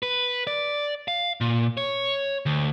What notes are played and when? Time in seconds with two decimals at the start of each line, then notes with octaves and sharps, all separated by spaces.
0.03 B4
0.47 D5
1.08 F5
1.41 A#2
1.77 C#5
2.46 D2